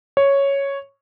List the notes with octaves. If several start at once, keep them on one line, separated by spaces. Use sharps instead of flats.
C#5